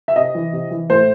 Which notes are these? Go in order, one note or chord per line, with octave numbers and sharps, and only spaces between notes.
E5
C3 D#5
E3
C3
E3
A2 C5